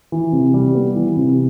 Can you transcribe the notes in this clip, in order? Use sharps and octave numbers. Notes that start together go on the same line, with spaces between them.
E3
C3
G3
B3
E3
C3